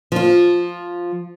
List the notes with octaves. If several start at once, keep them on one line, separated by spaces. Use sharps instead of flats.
F3 F4